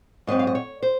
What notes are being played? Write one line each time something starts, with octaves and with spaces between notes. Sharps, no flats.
G#2 F#3 C4 D#5
F5
D#5
C#5
C5